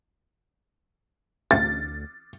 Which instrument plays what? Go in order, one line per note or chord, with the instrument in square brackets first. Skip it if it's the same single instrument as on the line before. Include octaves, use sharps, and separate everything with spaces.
[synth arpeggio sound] D2 [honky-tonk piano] A6